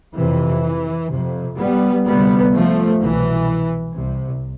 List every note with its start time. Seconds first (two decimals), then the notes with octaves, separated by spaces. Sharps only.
0.16 F2 C3 E3
1.11 F2 C3
1.59 G3 B3
2.07 D2 C3 G3 B3
2.55 F3 A3
3.02 C2 B2 E3
3.97 C2 C3